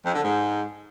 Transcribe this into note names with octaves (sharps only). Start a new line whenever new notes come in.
F2
D3
G#2